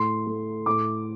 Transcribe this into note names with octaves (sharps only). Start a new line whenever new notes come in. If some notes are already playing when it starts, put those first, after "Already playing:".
Already playing: A2 C6
A3
A2 D6